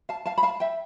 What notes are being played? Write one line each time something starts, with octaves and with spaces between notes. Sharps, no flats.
F5 A5
F5 A5
B5
F5 A5
E5 G5